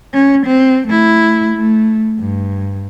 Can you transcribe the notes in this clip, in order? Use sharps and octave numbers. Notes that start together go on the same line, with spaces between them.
C#4
C4
A3 E4
A3
G2